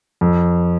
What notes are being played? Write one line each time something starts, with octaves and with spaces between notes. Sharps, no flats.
F2